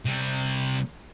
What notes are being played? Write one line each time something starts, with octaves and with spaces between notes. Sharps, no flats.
C3 G3